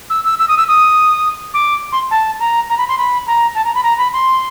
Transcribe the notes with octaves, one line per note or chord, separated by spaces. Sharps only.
E6
E6
E6
D#6
E6
D#6
D6
C6
A5
A#5
A#5
B5
C6
B5
A#5
A5
A#5
B5
A#5
B5
C6